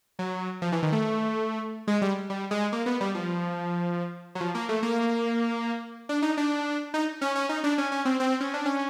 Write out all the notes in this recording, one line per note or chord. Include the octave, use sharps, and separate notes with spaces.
F#3
F3
E3
D#3
A3
G#3
G3
G3
G#3
A#3
B3
G3
F3
F#3
F3
A#3
A3
A#3
D4
D#4
D4
D#4
C#4
C#4
D#4
D4
C#4
C#4
C4
C4
C#4
D4
C#4